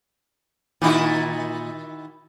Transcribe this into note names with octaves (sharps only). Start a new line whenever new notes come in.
A#2 D#3 D#4 E4 F#4